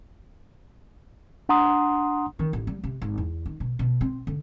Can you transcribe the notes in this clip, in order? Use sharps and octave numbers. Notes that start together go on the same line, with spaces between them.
D4 F#5 A#5 C6 D#6
D#3
A1
G3
C3
G#1
E2
D#3
B2
B2
C4
D3